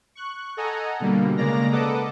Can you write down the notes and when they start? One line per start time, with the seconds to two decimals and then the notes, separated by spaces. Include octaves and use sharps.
0.15 C#6 F#6
0.57 A4 D#5 F#5 G#5 A#5
1.00 B2 D3 G3 A#3
1.37 C#3 G#3 A#3 D5 A#5 A#6
1.72 A4 B4 D#5 F#5 A5 D6